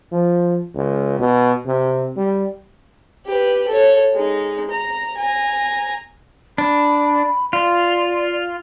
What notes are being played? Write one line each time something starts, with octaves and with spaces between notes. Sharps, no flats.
F3
C#2
B2
C3
G3
G4 B4
A4 C#5
G#3 D#4
A#5
G#5 A#5
D4 B5
F4 D5